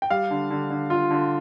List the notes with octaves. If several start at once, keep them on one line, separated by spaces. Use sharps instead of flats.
G5
G3 F5
D3
D3
D3
F4
D3